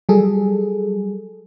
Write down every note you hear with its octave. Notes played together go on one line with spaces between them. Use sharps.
F#3 G3 G#4 A4